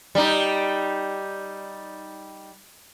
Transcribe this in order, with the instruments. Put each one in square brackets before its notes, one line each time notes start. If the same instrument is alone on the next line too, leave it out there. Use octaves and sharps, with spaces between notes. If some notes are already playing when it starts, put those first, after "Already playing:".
[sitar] G3 D#4